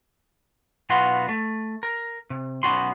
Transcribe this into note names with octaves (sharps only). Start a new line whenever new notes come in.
B1 B2 B3 F4 F#4 C6
A3
A#4
C3
B1 B3 C#4 F#4 C6